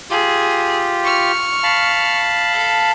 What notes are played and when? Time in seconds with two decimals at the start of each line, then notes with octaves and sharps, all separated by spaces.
0.10 F4 G4 G#4
1.04 C#6 F6
1.63 F5 A5 B5
2.52 A4